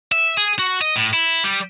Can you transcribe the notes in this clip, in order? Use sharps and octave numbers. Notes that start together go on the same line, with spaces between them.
E5
G#4
F#4
D#5
A2
E4
G3